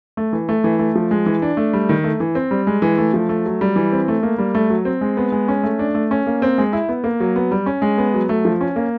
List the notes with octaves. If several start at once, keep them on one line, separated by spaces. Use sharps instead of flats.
A3
E3
A3
E3
A3
F3
G#3
E3
D4
A3
G3
D#3
A3
E3
C4
G3
G#3
E3
A3
F3
A3
F#3
G3
E3
C4
A3
A#3
G3
A3
F#3
C4
G#3
B3
G#3
C#4
A3
D4
A3
C#4
A#3
C4
G#3
E4
B3
A#3
F#3
B3
G3
C#4
G#3
B3
F#3
A3
F3
C#4
A#3